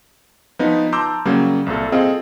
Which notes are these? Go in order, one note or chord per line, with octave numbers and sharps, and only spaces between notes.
F3 B3 D#4
A5 A#5 C6 D6 E6 G6
C#3 F#3 G3 A#3
C2 A#2 A4
C4 F4 G#4 A4 D#5 F5